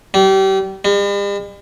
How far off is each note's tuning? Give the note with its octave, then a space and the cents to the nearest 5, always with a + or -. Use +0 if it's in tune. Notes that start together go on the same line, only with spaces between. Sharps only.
G3 -30
G3 +45